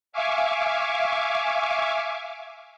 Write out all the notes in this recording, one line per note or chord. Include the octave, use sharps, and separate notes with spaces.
E5 F5 G#5 C#6 D6